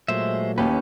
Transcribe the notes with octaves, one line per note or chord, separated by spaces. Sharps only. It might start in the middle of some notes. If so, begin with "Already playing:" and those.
A#2 F#3 G#3 A3 C5 E5
D#2 C#4 G4 B4